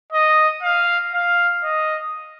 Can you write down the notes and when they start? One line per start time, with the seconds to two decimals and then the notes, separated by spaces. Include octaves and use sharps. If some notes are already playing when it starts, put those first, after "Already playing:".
0.12 D#5
0.63 F5
1.13 F5
1.63 D#5